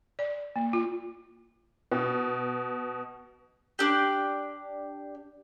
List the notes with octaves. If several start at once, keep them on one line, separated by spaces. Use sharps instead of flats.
D5
A#3
F4
B2
D4 G4